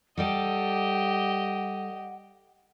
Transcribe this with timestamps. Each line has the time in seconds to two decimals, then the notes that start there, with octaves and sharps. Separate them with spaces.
0.17 G3 G4 A4 D5 D#5 F#5